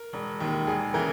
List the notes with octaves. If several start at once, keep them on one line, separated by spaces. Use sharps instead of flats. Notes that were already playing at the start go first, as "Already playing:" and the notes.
Already playing: A#4
E1
D#2 D#3
E1 G#4
C#3 E3 A#4